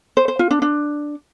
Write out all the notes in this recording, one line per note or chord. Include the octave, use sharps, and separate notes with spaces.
C5
C5
F4
D4
D4